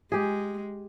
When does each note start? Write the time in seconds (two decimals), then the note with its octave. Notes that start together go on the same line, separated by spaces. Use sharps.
0.12 G#3 G4 G#4